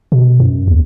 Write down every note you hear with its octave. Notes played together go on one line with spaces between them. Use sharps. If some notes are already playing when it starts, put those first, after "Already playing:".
B2
F#2
D#2